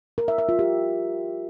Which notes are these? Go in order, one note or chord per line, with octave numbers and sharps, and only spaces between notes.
A#4
E5
E5
F4
G4